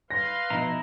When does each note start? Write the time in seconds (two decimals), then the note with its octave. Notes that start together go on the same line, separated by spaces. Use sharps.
0.10 B4 F5 C6 A#6
0.50 B2 F3 D#4 E4 A#5